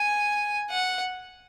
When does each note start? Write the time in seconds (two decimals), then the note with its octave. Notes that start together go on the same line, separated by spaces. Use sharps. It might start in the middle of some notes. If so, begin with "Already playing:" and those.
Already playing: G#5
0.70 F#5